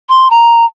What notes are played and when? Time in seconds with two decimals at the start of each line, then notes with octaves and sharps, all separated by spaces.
0.09 C6
0.30 A#5